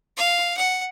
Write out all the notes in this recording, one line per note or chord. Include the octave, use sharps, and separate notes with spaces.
F5
F#5